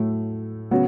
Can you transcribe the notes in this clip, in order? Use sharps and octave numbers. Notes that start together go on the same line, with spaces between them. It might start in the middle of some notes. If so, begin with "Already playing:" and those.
Already playing: A2 F#3 A3
C#3 F#3 B3 F#4